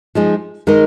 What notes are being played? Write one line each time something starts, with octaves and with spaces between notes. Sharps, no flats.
F3 G#3 D#4 G#4
D#3 G#3 D#4 A#4